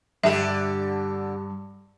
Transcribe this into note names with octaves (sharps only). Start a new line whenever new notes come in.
G2 D3 G4 E5